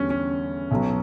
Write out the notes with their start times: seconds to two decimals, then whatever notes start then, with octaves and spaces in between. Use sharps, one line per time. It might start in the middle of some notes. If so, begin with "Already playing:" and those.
Already playing: E2 D3 G3 C#4
0.10 C#4
0.71 B1 B2 F#3